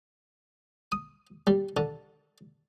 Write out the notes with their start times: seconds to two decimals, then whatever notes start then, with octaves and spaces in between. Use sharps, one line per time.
0.92 D#6
1.47 G3
1.77 D3